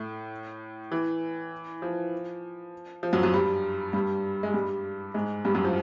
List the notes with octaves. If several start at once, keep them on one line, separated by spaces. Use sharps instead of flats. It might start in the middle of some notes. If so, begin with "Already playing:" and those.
Already playing: A2 A3
E3
F3
F3
F#2 F#3
F#2 F#3
G2 G3
G2 G3
G#3
G2 G3
G#2 G#3
G2 G3
F#2 F#3
F3